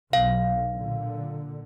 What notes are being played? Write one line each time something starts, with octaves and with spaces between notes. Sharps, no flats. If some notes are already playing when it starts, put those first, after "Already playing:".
B1 F5
A#2 D3